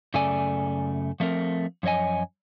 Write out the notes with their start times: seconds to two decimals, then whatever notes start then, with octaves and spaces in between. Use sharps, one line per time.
0.14 F#2 C#3 A3 A4 D5 G#5
1.20 F3 A3 C4 A#4
1.83 F#2 F3 C#5 D#5 G#5